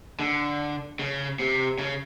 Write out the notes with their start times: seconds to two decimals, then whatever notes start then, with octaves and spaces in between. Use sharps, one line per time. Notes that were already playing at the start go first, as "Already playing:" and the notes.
0.20 D3
0.99 C#3
1.39 C3
1.79 C#3